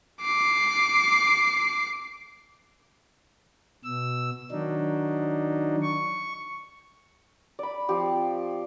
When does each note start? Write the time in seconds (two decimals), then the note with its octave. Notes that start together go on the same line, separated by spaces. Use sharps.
0.22 D6 C7
3.84 B2 E6
4.51 D#3 F#3 D4 D#4
5.82 C#6
7.59 D5 B5
7.89 F3 C4 G4